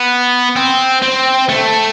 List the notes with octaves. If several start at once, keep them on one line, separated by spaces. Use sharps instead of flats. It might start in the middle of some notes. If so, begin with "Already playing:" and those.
Already playing: B3
C4
C4
A3